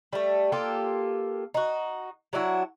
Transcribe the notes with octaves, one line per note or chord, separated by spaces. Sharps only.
G3 A3
A#3 F4 G4 A4
D#4 F#4
F#3 D4 E4 F#4